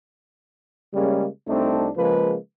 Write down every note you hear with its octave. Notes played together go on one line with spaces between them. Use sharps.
C#3 G3 G#3 A#3 C#4
C2 A3 C4 D4 D#4
C#3 F3 G#3 A#3 B4